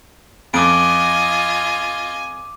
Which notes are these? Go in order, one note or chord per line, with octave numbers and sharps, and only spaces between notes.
F2 F4 D#5 G#5 D6 D#6 D7